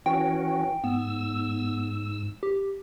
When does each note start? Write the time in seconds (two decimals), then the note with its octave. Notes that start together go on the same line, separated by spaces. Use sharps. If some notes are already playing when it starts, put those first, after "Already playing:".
0.06 E3 C#4 F#4 G5
0.84 G#2 B3 E6
2.43 G4